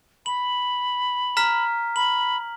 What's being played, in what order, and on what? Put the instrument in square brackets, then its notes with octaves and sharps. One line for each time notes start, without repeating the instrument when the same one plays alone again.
[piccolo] B5 [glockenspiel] F#7
[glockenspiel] A#5 F6 B6
[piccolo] B5 [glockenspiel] F#7